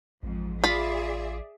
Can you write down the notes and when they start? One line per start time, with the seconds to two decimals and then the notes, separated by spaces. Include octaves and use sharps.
0.23 A1 F2 G#2
0.64 F4 G#4 D5 E5 B5